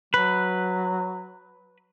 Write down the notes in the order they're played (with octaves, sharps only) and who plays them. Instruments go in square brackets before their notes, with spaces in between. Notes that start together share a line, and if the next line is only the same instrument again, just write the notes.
[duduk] F#3 [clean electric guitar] B4